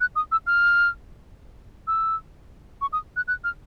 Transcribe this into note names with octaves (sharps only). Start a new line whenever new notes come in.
F#6
D#6
E6
F6
E6
C#6
D#6
F#6
F#6
F6